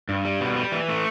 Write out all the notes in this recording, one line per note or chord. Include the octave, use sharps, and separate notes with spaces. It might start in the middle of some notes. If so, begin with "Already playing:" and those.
G2
G3
B2
G3
E3
A3